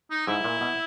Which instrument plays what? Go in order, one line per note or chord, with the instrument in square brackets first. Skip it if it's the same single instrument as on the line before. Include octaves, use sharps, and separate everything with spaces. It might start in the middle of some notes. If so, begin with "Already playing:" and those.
[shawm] D#4
[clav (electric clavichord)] G#2 [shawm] E4
[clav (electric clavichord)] A#2
B2